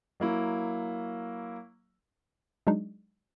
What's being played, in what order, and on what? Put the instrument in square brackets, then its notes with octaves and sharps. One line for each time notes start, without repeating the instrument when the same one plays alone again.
[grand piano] F#3 A#3 E4
[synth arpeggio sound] F#3 G#3 D4 D#4